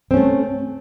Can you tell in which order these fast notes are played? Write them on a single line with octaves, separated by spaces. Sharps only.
C4 C#4 A3